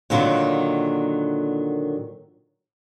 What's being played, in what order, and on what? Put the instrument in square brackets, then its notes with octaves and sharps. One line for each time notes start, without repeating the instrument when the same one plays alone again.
[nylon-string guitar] A#2 D3 D#3 F#3 A#3